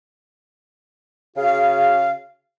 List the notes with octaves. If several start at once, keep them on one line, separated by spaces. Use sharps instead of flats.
C#3 F#4 G#4 F5